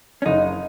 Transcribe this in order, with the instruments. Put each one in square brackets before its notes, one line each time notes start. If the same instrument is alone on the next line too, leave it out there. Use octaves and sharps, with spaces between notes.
[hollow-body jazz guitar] C#4
[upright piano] F#1 [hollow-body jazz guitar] D#4